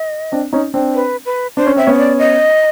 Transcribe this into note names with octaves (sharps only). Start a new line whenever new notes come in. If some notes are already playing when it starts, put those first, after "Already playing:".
Already playing: D#5
C4 D4
C#4 D#4
C4 D4
B4
B4
D4 C5
C#4
C4 E5
B3 C#4
C#5
D5
D#5